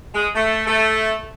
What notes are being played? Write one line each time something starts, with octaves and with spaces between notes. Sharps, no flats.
G#3
A3
A3